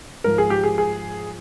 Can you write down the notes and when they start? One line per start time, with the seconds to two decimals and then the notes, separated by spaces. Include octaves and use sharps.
0.24 G#2 F3 A#4
0.38 G#4
0.50 G4
0.64 G#4
0.78 G#4